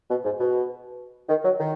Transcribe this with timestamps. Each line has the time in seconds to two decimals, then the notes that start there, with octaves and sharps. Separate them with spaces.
0.10 B2
0.24 G#2
0.40 B2
1.29 D#3
1.44 F#3
1.60 D#3